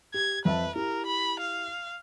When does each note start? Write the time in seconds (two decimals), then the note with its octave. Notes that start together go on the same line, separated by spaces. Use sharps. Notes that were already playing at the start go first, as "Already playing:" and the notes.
0.14 G4 G#6
0.45 F2 B4 E5 A5
0.76 E4 G4 A#4
1.06 B5
1.40 F5